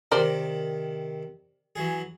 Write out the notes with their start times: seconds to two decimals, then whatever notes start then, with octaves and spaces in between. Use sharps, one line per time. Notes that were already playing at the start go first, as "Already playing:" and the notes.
0.12 C3 D#3 A#4 C5 D5
1.76 E3 F#3 G#4